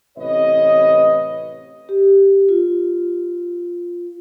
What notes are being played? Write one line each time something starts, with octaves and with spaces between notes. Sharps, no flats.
A1 C3 B4 C#5 D#5
G4
F4